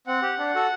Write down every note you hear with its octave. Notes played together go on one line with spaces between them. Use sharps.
C4 F#5
G4
D4
F#4 A4